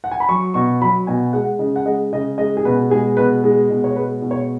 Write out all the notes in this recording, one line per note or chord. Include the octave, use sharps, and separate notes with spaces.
F#5
G#5
B5
F#3 C#6
B2 C#6
F#3 B5
B2 G#5
G#3 F#5
C#3 D#5
F#5
G#3 D#5
C#3 D#5
G#3 D#5
G#4
B2 B4
G#3 G#4
B2 B4
G#3 G#4
B2
C#5
G#3 B4
B2
C#5